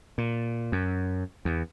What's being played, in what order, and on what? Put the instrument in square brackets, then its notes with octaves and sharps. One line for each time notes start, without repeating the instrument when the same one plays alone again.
[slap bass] A#2
F#2
E2